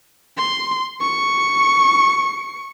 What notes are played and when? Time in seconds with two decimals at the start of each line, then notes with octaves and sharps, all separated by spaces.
0.37 C6
1.00 C#6 C#7